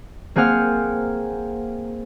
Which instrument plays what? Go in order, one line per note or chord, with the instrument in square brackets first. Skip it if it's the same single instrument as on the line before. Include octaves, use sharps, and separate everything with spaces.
[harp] A#3 C4 G#4 F#5 F6